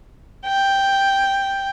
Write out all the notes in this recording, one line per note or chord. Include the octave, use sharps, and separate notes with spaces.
G5